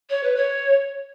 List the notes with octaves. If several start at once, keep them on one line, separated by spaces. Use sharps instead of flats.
C#5
B4
C#5